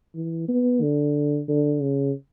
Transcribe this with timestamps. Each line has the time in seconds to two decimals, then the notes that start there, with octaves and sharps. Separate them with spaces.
0.15 E3
0.48 B3
0.81 D3
1.48 D3
1.82 C#3